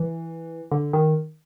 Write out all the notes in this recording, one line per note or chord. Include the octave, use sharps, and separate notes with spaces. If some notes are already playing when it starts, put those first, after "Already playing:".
Already playing: E3
D3
D#3